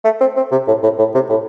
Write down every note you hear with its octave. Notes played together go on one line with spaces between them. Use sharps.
A3
C4
C4
C3
A2
A2
A2
C3
A2